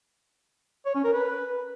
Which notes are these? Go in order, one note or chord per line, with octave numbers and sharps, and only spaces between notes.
C#5
C#4
A#4
B4